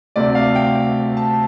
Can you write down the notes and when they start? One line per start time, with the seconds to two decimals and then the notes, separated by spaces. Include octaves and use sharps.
0.16 D2 C3 A3 C4 D5
0.35 F5
0.55 G5
1.17 A5